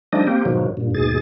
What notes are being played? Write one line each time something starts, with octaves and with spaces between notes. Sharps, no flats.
F3 G3 A3 D4 D#4 D#5
A#3 C4 G4
G#2 B2 D#3 F3 F#3
G2 A#2
D#2 G#2 B2 G#4 A6